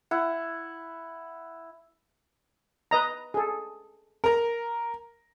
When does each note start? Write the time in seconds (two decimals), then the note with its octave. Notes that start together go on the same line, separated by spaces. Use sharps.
0.11 E4 F#5
2.91 B4 D#5 A#5
3.34 G#4 A4
4.24 A#4 A#5